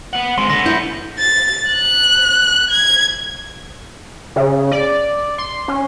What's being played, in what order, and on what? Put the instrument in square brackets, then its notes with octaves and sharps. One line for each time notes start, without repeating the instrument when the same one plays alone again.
[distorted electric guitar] B3 F#5
[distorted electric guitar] G#3 C4 [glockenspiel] C6
[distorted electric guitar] D3 B3 [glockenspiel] C6 A#6
[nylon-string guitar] E4 [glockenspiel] G6
[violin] A6
F#6
G#6
[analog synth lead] C#3
D5
C6
C#4